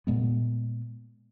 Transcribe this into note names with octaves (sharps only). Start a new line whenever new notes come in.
A#2 G#3 B3